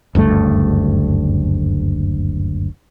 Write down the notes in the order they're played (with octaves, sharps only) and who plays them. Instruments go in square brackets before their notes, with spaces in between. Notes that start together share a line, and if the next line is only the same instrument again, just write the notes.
[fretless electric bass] F#1 D2 G2 A3